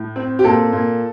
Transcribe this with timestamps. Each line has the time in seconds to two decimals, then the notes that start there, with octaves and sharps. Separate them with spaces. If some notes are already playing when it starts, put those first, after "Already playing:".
Already playing: A2
0.16 C4
0.39 G4
0.44 A#2 A4
0.73 A#2